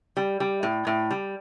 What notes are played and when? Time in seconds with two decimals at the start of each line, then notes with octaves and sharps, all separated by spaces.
0.17 G3
0.40 G3
0.63 A2
0.87 A2
1.11 G3